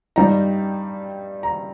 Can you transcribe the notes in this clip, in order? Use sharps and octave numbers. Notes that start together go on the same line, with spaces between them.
G2 G3 D#4 A#5
A#5